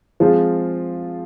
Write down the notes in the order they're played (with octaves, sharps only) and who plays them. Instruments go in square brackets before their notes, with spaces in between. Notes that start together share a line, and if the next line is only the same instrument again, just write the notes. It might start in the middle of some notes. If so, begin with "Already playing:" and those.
[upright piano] F3 G#3 C4 F4 G#4